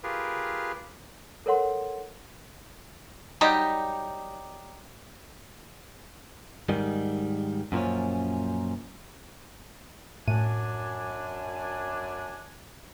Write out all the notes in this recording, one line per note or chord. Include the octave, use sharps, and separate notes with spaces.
F4 G4 G#4 A#4 B4
A4 A#4 C#5 F#5 C6
F#3 G3 D#4 G4
G#2 D#3 G3
F#2 A#2 F3 C#4
F#2 A2 D4 G#5 D#7